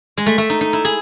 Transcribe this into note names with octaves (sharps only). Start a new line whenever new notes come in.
G#3
A3
A3
D#4
D#4
E4
G#4